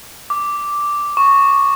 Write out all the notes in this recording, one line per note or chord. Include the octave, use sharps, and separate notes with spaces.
D6
C#6